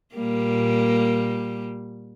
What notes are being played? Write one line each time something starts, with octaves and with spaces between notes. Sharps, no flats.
A#2 G3 A#3